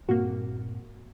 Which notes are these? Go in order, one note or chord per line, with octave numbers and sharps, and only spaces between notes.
G2 A#2 A#3 C4 F#4